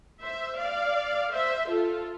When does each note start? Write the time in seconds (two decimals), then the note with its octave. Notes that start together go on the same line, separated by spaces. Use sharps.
0.21 C5 E5
0.58 D5 F5
1.32 C5 E5
1.69 F4 A4